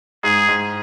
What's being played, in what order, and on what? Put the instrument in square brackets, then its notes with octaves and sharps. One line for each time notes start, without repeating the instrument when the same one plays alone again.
[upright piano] G#2 [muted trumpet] G#4
[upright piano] G#2